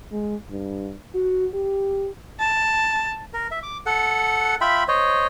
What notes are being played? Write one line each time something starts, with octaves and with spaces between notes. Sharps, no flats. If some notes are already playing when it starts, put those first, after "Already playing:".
G#3
G2
F#4
G4
A5
A#4
E5
D6
A4 F#5
F4 E5 G5 B5
C5 C#5 D#5